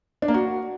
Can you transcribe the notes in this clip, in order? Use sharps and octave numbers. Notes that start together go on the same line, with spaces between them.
D4
A#3
F#4